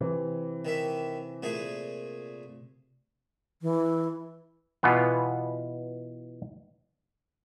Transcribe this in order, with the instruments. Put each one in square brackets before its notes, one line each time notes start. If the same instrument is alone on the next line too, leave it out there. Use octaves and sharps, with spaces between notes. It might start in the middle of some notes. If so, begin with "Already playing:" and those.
[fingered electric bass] C3 [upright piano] E3
[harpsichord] D#3 E5
A#2 A3 G#4
[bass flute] E3
[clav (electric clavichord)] B2 E3 B3 F4